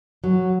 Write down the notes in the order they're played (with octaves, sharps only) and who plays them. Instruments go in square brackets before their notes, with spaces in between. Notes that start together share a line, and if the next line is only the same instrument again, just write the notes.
[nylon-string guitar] F#3